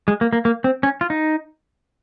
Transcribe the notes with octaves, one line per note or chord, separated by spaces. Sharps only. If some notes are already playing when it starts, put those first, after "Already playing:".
G#3
A#3
A#3
A#3
C4
C#4
F4
D#4